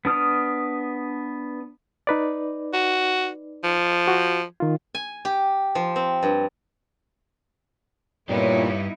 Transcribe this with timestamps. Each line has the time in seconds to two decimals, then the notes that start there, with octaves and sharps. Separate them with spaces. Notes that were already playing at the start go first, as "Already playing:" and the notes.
0.05 B3 D4 D#6 F6
2.07 D#4 B4 D5
2.73 F#4
3.64 F3
4.08 F#4
4.60 D#3 F4
4.95 G#5
5.25 G4
5.75 F3
5.96 C4
6.23 G2
8.29 G2 A#2 B3 D#4 E4 G4 C#5